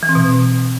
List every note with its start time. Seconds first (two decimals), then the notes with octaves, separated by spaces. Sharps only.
0.03 E3
0.09 C4
0.15 B2